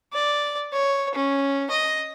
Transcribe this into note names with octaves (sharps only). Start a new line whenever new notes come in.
D5
C#5
C#4
D#5